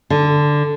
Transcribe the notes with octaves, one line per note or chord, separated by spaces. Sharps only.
D3